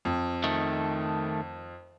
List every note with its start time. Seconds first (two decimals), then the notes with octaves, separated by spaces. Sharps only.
0.05 F2
0.44 D#3 A3